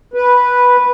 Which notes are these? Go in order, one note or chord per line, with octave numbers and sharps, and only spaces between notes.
B4